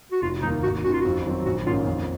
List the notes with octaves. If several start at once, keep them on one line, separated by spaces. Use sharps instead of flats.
F#4
F1 F4
D#2 D#3 A#3 D#4
G#1 F#4
F#2 D#3 F#4
F4
F2 F#4
D#3 F#3 C4
A#1 F#4
G#2 D#3 A#3 C#4 F4
F2